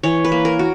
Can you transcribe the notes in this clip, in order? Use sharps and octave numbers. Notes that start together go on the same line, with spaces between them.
E3 C#5
B4
A#3
A#4
F#4